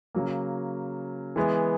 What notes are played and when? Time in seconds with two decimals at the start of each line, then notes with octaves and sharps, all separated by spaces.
0.15 C#3 F#3 A#3
1.36 E3 G#3 B3